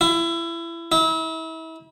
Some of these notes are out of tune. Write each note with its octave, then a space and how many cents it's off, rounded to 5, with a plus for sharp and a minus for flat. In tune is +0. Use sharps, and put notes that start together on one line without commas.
E4 +25
E4 -35